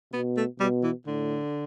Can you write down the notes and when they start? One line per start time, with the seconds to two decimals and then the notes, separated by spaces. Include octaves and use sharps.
0.14 B2 B3
0.37 A3
0.60 B2 G3
0.83 E3
1.07 A2 D3